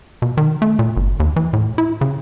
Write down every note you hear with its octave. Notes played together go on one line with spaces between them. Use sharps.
B2
D#3
A3
A#2
G1
D#2
E3
A2
E4
C#3